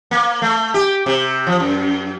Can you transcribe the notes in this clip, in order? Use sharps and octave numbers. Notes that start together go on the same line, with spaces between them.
A#3
A3
G4
C3
F3
F#2